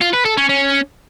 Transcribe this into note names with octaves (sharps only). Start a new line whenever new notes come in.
F4
B4
A4
C#4
C#4